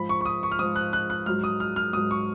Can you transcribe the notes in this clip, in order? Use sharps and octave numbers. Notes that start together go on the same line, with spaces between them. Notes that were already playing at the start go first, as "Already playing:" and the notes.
Already playing: G#2 F3 B5
C#6
C#6
D#6
C#6
F6
G#2 F3 D#6
F#6
F#6
F#6
G#2 F#3 F6
D#6
F6
F6
G#2 F#3 D#6
C#6